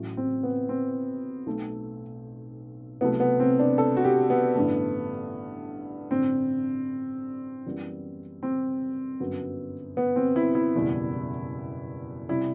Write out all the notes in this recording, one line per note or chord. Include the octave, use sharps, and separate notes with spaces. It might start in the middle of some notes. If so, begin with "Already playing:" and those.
Already playing: A1 A2 F#3
C4
B3
C4
B1 B2 A3
C2 C3 F#3 A3 B3
B3
C4
D4
A4
F#4
G4
B3
A1 G2 D3 A3
A1 G2 D3 C4
F#2 E3 G3 B3
C4
G1 F#2 F#3 B3
B3
C4
E4
E4
F#1 E2 B2 G3
C3 G3 E4